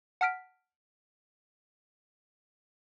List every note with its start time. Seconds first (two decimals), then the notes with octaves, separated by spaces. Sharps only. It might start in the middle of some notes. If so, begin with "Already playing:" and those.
0.21 F#5 A5 F6 B6 D7